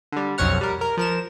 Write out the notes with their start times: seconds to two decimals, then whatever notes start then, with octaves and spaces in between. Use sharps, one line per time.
0.12 D3 G3
0.38 B1 F2 C#5 F#5 F6
0.61 G3 A#4
0.81 A#4
0.97 F3 A#4 E7